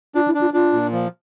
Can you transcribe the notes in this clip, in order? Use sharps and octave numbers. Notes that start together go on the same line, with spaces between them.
D4 F4
E4
D4
F4
D4 F4
A#2
F3